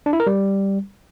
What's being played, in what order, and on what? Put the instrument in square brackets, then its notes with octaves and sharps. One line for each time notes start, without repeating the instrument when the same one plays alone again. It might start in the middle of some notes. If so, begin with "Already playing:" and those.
[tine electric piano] D4
E4
A#4
G3